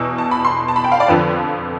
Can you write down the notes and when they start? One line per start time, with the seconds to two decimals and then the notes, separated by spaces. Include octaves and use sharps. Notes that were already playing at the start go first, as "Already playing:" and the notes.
Already playing: E2 B2 E6
0.18 A5
0.31 B5
0.44 C6
0.68 A5
0.76 B5
0.84 G5
0.92 F5
1.00 D5
1.08 F2 D3 F3 B4